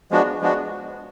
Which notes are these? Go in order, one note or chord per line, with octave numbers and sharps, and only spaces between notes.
F3 G#3 B3 D4 F#4
F3 G#3 B3 D4 F#4